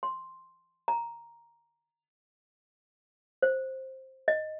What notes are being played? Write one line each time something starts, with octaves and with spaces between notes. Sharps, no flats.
C6
A#5
C5
D#5